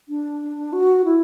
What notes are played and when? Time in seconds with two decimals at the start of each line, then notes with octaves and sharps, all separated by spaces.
0.09 D4
0.73 F#4
1.05 E4